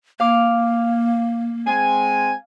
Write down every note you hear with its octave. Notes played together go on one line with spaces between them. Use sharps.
A#3 F5 D6
G#3 C4 G#5